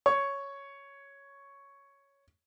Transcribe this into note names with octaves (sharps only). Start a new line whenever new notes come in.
C#5 C#6